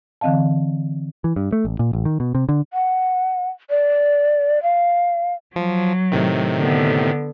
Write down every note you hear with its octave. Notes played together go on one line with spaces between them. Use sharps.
D3 E3 C4 D#5 F5 A5
E3
G2
A3
A1
A#2
A1
D#3
B2
C3
D3
F#5
D5
F5
F3 F#3
A2 C3 D#3
D3 B3